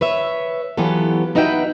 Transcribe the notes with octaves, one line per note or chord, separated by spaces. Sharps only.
B4 C#5 E5
E3 F#3 B3 F4 G4 A4
B3 D#4 F#4 B4 E5 G5